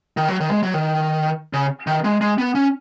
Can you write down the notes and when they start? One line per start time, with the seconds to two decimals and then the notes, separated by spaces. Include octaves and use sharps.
0.17 D#3
0.28 F#3
0.40 D#3
0.51 G#3
0.63 F#3
0.74 D#3
1.53 C#3
1.87 D#3
2.04 G#3
2.21 G#3
2.38 B3
2.55 C#4